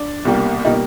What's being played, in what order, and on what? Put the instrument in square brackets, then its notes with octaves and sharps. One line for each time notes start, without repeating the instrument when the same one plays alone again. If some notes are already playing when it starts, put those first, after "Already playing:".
Already playing: [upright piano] D4
C2 B2 G3 A#3
B2 G3 A#3 D#4